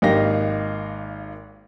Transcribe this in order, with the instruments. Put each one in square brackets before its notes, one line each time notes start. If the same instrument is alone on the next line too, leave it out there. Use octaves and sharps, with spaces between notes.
[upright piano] G#1 A#3 D#4 G4 F5 A#6